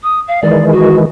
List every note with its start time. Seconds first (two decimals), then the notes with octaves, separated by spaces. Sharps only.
0.03 D#6
0.28 F5
0.43 D#3 E3 G#3 D5
0.71 F#4